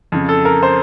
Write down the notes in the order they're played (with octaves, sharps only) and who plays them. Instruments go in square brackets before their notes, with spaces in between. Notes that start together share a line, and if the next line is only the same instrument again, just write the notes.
[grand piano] F2 C#3
A4
A#4
C5